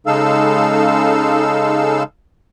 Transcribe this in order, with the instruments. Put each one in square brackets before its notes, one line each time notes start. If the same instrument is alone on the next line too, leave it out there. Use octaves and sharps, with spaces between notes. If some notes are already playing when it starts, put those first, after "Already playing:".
[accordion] C#3 G#3 D#4 A4 F5 E6